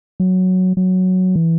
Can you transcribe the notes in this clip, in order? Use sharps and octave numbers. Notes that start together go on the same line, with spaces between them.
F#3
F#3
E3